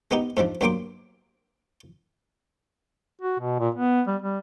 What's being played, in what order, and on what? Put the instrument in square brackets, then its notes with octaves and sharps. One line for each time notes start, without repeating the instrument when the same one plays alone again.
[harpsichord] G#3 B3 D#4 G4
G#2 F3 G3 D4
G2 F#3 A#3 G5 C6 D6
[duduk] F#4
B2
A#2
B3
G3
G3